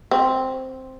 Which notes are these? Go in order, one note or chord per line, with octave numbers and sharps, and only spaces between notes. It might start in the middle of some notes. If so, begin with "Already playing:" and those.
C4